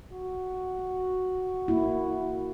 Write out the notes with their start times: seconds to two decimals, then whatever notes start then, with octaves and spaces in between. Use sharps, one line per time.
0.12 F#4
1.68 A#3 E4